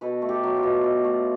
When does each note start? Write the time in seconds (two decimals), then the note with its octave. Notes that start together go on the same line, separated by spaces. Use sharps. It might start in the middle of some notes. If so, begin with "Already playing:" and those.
0.01 B2 A4 B4
0.22 A3
0.29 G4 A4
0.43 F#3
0.57 F4 G4
0.63 B2
0.84 B2
1.04 A3